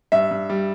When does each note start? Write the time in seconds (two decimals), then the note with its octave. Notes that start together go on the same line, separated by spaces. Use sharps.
0.12 G2 E5
0.31 G2
0.50 G3